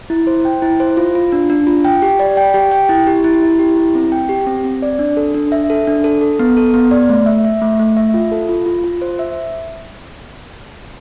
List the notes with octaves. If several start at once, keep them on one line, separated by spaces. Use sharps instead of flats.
E4
C5
G5
E4
C5
F4
F4
D4
D4
F4
G5
G4
D5
G5
G4
G5
E4
G4
E4
E4
G4
E4
C4
G5
G4
C4
C4
D5
D4
A4
D4
E5
A4
D4
A4
A4
B3
A4
B3
D5
A3
E5
E5
A3
A3
E5
F4
A4
F4
F4
F4
C5
E5